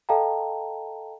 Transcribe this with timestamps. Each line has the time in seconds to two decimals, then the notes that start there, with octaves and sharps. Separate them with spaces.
0.09 A4 D#5 F5 G5 A5 A#5